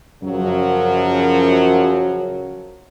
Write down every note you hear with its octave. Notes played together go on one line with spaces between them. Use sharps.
F#2 C#3 F3 F#3